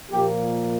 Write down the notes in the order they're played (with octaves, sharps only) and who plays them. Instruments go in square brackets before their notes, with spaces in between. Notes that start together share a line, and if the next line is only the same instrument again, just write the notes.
[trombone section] A#2 F3 A#3 G4